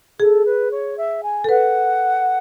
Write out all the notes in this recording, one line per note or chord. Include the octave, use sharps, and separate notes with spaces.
G#4 A4
B4
C#5
E5
G#5
A4
B4 F#5